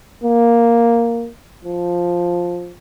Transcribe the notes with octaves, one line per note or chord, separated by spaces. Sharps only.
A#3
F3